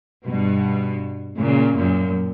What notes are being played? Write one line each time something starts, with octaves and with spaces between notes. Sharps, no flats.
G2 B2
A#2 C#3
F#2 A#2